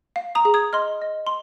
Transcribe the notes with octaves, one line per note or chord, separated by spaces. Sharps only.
F5
A#5 D#6
G#4
D#6 G#6
D#5 C6 F6
D#5
C6